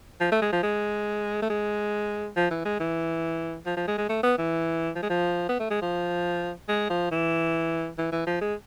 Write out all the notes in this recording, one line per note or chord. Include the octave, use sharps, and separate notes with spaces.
F3
A3
G#3
F3
G#3
A3
G#3
F3
E3
G#3
E3
F3
F3
G#3
G#3
A3
B3
E3
F3
G#3
F3
B3
A3
G#3
F3
G#3
F3
E3
E3
E3
F3
G#3